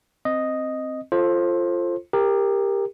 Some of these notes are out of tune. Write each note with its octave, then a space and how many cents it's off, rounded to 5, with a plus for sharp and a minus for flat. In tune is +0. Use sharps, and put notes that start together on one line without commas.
C4 +0 D#5 +0
F4 -10 A4 +0 C5 +20
G4 +20 A#4 +0